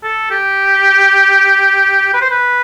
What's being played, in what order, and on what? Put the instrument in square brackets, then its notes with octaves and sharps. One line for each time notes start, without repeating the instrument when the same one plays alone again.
[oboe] A4
G4
B4
C5
B4